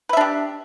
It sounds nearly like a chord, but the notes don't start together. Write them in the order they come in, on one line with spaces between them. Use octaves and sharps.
B4 E5 D4 G4